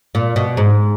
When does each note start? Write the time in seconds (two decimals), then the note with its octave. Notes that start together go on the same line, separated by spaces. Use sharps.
0.15 A#2
0.36 B2
0.57 G#2